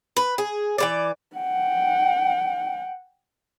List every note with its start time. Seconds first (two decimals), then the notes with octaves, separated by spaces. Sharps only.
0.16 B4
0.38 G#4
0.78 E3 G#3 D5
1.37 F#5 G5